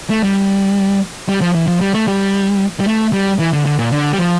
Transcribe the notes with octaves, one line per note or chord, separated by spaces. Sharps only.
A3
G3
G3
F3
E3
F3
G3
A3
G3
G3
A3
G3
E3
D3
D3
A#2
D3
G3
F3